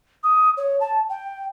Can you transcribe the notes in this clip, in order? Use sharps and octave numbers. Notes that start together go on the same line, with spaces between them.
D#6
C#5
A5
G5